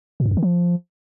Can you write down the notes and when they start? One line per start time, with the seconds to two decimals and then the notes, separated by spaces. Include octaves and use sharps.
0.20 A#2
0.26 G2
0.31 F2
0.37 D#3
0.43 F3